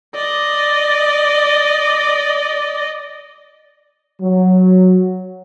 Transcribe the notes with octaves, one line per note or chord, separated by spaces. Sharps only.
D5 D#5
F#3